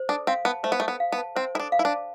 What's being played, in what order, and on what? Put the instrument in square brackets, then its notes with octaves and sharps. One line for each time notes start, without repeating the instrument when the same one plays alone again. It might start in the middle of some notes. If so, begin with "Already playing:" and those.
Already playing: [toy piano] C5
[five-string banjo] D4 [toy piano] A4
[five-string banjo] C4 [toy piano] F5
[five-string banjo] B3 [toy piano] A5
[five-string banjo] A3 [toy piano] C5
[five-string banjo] B3
[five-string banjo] A3 [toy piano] A4
[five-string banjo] B3
[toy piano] F5
[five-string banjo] B3
[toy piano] A5
[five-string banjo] C4 [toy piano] C5
[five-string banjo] E4 [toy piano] A4
[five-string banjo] D4
[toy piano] F5
[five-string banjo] E4
D4
[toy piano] A5